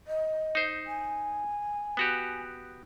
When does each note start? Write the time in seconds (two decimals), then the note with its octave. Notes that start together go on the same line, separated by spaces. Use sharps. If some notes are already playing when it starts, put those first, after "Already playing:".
0.07 D#5
0.55 D#4 C5
0.86 G#5
1.97 B3 F#4 G4